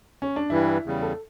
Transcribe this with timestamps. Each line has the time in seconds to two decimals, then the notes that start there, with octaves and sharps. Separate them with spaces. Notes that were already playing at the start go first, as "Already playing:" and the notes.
0.22 C#4
0.36 D4
0.50 G2 E3 G3 E4
0.85 E2 C#3 G3
1.02 A4